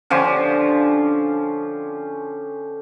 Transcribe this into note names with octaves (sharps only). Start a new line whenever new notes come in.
D3 F3 C#4 G4